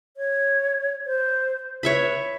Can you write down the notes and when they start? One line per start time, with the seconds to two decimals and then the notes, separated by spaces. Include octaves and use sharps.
0.17 C#5
1.06 C5
1.83 B4 C#5 E5 B5